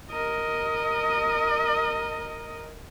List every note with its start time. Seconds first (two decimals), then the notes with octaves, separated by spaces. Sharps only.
0.11 A#4 D#5